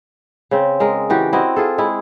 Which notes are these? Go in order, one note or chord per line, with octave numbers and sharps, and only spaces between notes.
C#3 C4
G#3 A#4
E3 F#4 G4
C4 E4 F#4 D#5
F4 G#4 A4
G#3 E4